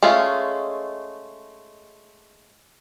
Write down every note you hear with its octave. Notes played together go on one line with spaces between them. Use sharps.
G#3 A3 C#4 F4